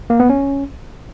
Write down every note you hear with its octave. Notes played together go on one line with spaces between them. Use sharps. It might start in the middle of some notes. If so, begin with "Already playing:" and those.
A#3
B3
C#4